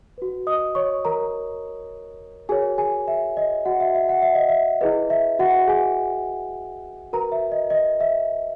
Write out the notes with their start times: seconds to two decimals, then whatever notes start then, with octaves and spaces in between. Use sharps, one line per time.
0.18 F#4 B4
0.47 D#5 D#6
0.75 C#5 C#6
1.05 A#4 A#5
2.49 F#4 G#4 A#4 C#5 G#5
2.78 G#4 G#5
3.08 E5
3.37 D#5
3.65 F#4 F#5
3.80 E5
3.94 E5
4.09 F#5
4.22 E5
4.35 D#5
4.49 E5
4.81 E4 G#4 B4 D#5
5.10 E5
5.39 F#4 F#5
5.68 G#4 G#5
7.13 F#4 A#4 B4 A#5
7.32 E5
7.52 D#5
7.70 D#5
8.00 E5